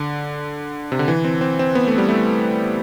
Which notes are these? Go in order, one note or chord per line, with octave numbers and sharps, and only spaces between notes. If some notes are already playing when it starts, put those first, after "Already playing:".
Already playing: D3
C3
D3
E3
C4
C4
C4
B3
A3
G3
A3